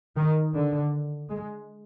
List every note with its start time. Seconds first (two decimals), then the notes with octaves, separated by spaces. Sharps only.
0.16 D#3
0.55 D3
1.29 G#3